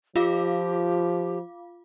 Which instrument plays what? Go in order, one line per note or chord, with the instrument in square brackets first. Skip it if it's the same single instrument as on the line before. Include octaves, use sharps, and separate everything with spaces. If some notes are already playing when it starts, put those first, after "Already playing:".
[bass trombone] F3 [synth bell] F4 F5 D6 [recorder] G4